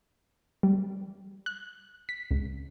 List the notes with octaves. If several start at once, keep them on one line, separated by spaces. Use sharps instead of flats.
G3
F#6
B6
C#2